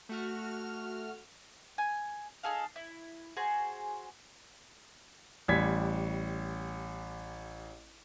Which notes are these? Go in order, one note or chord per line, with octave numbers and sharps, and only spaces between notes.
A3 F#4 F6
G#5
D#4 G#4 A4 F5
E4
F#4 G#4 C5
A1 G3 G#6 B6